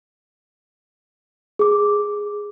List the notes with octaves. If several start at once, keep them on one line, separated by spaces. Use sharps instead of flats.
G#4 D6